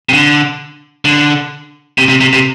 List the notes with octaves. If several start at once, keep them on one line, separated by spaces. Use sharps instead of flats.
C3
D3
D3
C3
C3
C3
C3